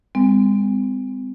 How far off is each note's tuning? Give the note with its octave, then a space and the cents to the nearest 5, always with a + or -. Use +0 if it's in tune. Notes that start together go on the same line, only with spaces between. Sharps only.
G#3 -45 C4 -35